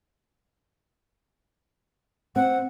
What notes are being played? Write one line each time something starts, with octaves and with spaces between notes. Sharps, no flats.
C4 F#5